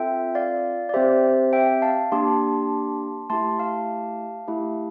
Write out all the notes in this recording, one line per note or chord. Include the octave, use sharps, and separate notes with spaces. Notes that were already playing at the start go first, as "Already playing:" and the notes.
Already playing: C4 F4 A4 E5 G5
D5 F5
D5
C4 G4 C5 E5
E5 G5
F5 A5
A#3 D4 G4 A5 C6
A3 E4 G4 A5 C6
F5 A5
A3 E4 G4